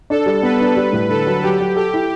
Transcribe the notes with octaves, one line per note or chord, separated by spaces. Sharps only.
D4 A4
G3
B3 B4
D4
G3
A2
D3 A4
F#3
F#3 G4
F#3
G4 A4
E4